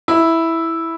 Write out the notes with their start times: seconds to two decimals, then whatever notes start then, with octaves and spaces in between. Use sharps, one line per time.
0.08 E4